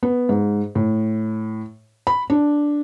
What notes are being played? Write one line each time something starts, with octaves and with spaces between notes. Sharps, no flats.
B3
G#2
A2
B5
D4